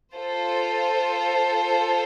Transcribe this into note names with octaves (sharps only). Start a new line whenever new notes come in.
F4 A4 C5